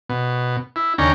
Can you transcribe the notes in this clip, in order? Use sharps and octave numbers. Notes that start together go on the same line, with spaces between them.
B2
E4
D#2 C#3 C#4 D4 G5 A#5